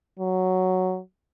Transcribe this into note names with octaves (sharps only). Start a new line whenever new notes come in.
F#3